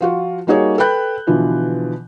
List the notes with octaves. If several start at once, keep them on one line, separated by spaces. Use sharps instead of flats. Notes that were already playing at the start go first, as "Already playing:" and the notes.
F3 F4 F#4
G3 A#3 D#4 F#4 G#4 C#5
A4 B4 G5 B5 F#6 G6
B2 D3 E3 F3